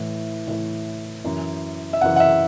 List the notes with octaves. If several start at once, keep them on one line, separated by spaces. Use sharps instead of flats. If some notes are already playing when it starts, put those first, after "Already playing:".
Already playing: A2 E3
A2 E3
F#2 E3
E5
F#2 E3 F#5
F#5
E5